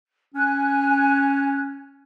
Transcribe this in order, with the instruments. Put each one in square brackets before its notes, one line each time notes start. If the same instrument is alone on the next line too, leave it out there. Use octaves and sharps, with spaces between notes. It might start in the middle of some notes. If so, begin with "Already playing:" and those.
[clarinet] C#4 [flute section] G#5 F#6